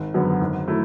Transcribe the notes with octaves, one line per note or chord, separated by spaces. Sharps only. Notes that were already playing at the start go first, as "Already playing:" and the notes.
Already playing: G#1
F#2 D3 F#3 B3
G#1
F#3 A3 E4